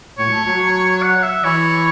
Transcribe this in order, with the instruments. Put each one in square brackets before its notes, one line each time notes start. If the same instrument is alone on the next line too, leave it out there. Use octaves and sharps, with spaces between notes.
[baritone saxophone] A2 [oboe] C#5
[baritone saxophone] F#3
A3
F#3
[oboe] F#5
E5
[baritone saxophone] E3 [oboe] C#5